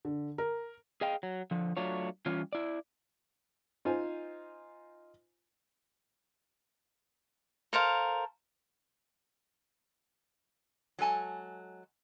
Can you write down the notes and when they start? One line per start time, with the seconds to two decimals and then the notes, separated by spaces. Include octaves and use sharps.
0.05 D3
0.38 A#4
1.01 G#4 D#5 F5 G5
1.23 F#3
1.51 D3 F3
1.77 F#3 A3 D4 F4 C#5
2.26 E3 G3 C#4 F4 C#5
2.53 E4 D5
3.85 D#4 F4 C5 G#5
7.73 A4 A#4 C5 F5
10.99 F#3 G#3 A4 G#5 A5